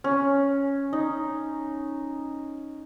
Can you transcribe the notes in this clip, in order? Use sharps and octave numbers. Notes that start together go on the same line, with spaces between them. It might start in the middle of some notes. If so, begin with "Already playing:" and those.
C#4
D#4